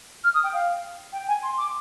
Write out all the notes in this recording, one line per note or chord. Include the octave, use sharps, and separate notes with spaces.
F6
D#6
G5
F5
G5
G#5
C6
D6